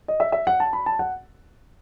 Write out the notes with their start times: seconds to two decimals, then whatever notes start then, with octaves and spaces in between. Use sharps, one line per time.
0.08 D#5
0.20 E5
0.32 E5
0.47 F#5
0.60 A5
0.73 B5
0.86 A5
0.99 F#5